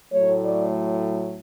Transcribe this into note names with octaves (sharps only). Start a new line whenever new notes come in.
A2 F#3 A3 C#5
D5
C#5